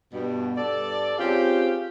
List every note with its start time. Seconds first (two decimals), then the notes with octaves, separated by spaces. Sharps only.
0.13 G2 B2
0.57 G2 A4 D5
1.18 C4 C#4 F4 G4 G#4